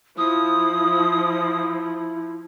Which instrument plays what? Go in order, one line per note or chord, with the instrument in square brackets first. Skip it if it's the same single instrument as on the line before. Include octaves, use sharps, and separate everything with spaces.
[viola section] F3 [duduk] E4 [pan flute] D#6